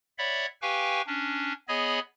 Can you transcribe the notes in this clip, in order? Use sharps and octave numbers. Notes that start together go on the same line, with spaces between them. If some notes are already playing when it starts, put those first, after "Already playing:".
C#5 D5 E5 F#5 B5
G4 B4 F5 G5 G#5 C#6
C#4 D4
B3 G#4 C#5 D#5 G#5 B5